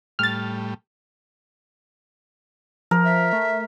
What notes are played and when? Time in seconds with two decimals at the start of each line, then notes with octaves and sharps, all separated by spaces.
0.19 A2 G3 F6 A6
2.91 F3 A#4
3.04 E5
3.33 A3